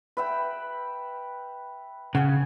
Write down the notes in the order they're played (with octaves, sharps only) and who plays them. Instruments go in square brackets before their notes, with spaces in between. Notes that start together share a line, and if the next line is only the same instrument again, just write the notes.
[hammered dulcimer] B4 E5 G5
[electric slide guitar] C#3 [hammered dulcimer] F#5 G#5